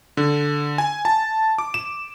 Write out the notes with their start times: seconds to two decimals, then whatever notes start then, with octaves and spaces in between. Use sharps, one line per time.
0.17 D3
0.78 G#5
1.05 A5
1.58 D6
1.74 E7